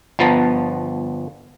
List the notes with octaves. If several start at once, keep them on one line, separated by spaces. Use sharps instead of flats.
G1 F3 B3 A5 A#5